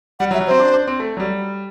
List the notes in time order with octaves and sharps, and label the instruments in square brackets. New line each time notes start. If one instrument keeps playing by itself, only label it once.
[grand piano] G3 [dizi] F#5
[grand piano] F#3
[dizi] E5
[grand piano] F#3
[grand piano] C4 [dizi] C5
[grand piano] D4
D4
C4
A3
F#3
G3